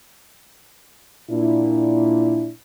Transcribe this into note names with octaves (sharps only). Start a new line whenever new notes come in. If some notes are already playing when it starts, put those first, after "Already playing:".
A#2 D4 E4